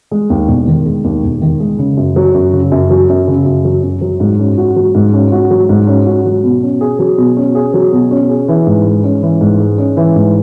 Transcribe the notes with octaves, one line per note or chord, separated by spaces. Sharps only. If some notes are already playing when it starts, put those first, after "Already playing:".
G#3
D#2
E1
D#3
G#3
D#2
E1
D#3
G#3
C#3
F#2
F#3
F#2
C#3
F#2
F#3
F#2
C#3
F#2
F#3
F#2
F#3
G#2
C#4
F#4
F#3
G#2
C#4
F#4
F#3
G#2
C#4
F#4
F#3
B2
C#4
G#4
F#3
B2
C#4
G#4
F#3
B2
C#4
G#4
E3
G#2
G#3
C#4
E3
G#2
G#3
C#4
E3
G#2